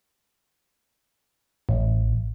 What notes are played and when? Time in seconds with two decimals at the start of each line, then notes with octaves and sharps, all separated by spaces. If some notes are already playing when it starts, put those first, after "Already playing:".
1.69 A1